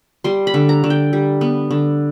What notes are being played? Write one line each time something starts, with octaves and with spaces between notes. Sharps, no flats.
G3 C6
B5
D3
A#5
D3
G5
G3
B3
D3